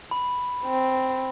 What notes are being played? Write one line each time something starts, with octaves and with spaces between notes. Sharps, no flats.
B5
C4